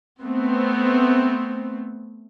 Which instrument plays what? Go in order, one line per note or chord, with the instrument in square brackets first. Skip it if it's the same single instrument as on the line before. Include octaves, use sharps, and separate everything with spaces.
[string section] A3 B3 C4